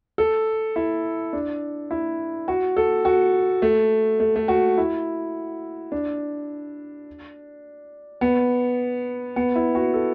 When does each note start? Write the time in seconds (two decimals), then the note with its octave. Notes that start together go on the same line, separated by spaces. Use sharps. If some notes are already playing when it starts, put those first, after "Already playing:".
0.18 A4
0.76 E4
1.33 D4
1.91 E4
2.48 F#4
2.77 A4
3.05 F#4
3.62 A3
4.20 A3
4.36 A3
4.48 F#4
4.78 E4
5.92 D4
8.21 B3
9.36 B3
9.55 E4
9.75 F#4
9.94 A4